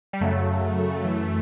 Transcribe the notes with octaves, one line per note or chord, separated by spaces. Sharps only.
G3
F#2 C#3 F#3 A3
F#2 E3